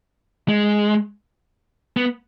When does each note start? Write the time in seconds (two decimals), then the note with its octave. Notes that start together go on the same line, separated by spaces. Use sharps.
0.49 G#3
1.97 B3